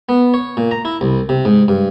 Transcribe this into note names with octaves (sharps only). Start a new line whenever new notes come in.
B3
C#5
A#2
A#5
E4
C2
C3
G#2
G2